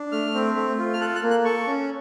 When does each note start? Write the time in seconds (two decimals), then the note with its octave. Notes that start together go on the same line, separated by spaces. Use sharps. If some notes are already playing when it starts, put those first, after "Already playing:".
Already playing: D4
0.12 A3 F6
0.34 C4
0.56 A3
0.78 F4
0.93 F6
1.00 A4 F#6
1.15 F#6
1.23 A#3
1.30 F#6
1.45 A4 C#6
1.67 C#4